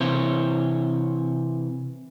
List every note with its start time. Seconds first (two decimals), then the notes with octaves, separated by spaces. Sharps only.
0.01 C3 E3 C5 C#5